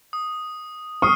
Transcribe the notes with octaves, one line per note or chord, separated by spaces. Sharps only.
D#6
C#6 D#6 F6 C7